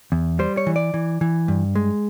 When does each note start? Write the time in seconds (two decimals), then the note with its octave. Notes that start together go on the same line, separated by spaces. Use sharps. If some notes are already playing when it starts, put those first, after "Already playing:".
0.12 E2
0.39 G3 C5
0.57 C#5
0.67 E3
0.76 D5
0.94 E3
1.21 E3
1.48 G2
1.75 G#3